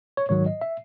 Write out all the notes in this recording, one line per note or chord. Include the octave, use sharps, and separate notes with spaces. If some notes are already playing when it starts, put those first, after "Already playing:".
C#5
G#2 D#3 F#3 C#5
D#5
E5